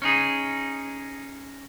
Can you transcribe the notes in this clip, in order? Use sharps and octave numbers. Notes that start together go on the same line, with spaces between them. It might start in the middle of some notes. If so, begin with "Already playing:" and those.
C#4 D#4 G#4